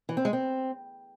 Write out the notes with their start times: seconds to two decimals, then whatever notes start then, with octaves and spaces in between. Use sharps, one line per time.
0.09 E3
0.17 C4
0.25 G#3
0.33 C4